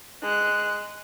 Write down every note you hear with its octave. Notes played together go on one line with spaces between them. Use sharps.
G#3 F#6